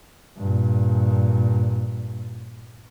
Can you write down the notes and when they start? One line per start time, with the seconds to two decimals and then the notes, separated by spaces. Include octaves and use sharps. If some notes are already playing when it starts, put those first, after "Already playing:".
0.38 G2 A#2